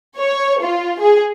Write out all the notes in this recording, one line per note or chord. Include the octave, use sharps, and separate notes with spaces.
C#5
F4
G#4